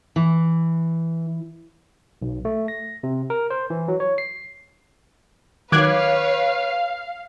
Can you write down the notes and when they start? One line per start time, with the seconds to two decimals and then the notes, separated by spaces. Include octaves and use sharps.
0.16 E3
2.22 B1
2.45 A3
2.68 A#6
3.03 C3
3.30 A#4
3.50 C5
3.70 E3
3.88 F#3
4.00 C#5
4.18 C7
5.72 D#3 F#3 B4 C#5 F5 D6 F#6 G#6